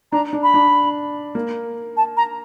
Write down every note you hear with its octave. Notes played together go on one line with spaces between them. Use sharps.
D4 A#5
D4
B5
D4
A#3
A5
A#5